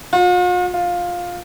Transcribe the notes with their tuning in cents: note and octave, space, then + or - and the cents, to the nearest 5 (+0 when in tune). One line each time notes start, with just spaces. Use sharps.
F4 +45
F4 +10